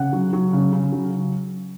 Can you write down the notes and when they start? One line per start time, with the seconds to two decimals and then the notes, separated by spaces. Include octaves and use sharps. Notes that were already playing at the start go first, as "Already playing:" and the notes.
Already playing: C#3 F#5
0.13 F#3
0.33 F#3
0.53 C#3
0.72 C#3
0.93 F#3